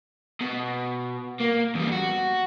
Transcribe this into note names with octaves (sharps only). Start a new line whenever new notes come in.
B2
A#3
E2 G3
F#4